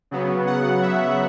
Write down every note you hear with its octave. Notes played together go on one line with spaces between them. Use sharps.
C#3 F#3 B3
F#5
E5